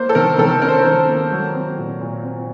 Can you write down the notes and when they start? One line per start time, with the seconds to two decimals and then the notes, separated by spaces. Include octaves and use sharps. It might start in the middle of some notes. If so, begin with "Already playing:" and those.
Already playing: A#3 C5
0.09 A4
0.15 D#3 A#4
0.38 D#3 A4
0.62 C#4 A#4
0.68 C5
0.77 A#4
0.85 D#3
1.08 A#3
1.32 F#3
1.54 C4
1.77 A#2
2.01 A#2
2.24 C4